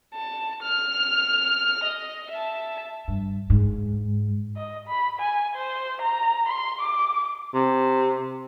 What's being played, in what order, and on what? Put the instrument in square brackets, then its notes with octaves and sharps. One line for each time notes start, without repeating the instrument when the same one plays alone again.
[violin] A5
F6
D#5
E5 A5
[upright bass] G2
G#2
[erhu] D#5
B5
G#5
C5
A#5
C6
D6
[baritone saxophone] C3